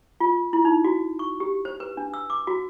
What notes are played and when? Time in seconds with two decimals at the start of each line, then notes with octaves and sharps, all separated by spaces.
0.20 F4
0.53 E4
0.65 D#4
0.85 F#4
1.19 C#6
1.40 G4
1.65 C5
1.80 B4
1.97 D4
2.14 E6
2.30 D6
2.47 F#4